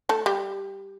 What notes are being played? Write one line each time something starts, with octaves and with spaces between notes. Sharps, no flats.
A3 A4
G3 G4